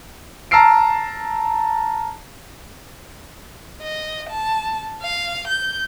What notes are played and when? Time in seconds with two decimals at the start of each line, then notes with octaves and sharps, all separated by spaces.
0.51 A5 A#5 E6 F6 C7 D7
3.82 D#5
4.29 A5
5.03 F5
5.48 G6